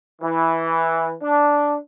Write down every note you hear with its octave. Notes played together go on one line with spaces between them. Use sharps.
E3
D4